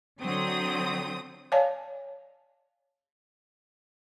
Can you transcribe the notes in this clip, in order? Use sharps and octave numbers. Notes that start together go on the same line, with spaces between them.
D3 F#3 C4 D#6
C#5 D5 F5 G#5 A5